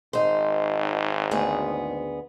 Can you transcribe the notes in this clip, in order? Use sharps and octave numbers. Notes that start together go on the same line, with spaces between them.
G#1 D#4 C5
D2 B3 G#4